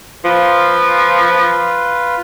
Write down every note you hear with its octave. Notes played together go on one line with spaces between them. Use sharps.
F3 F4 B4